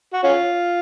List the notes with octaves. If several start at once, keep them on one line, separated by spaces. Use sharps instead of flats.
F#4
C#4 F4